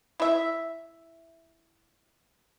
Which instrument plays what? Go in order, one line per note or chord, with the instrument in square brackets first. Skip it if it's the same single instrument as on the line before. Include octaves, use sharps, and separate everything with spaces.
[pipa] E4 E5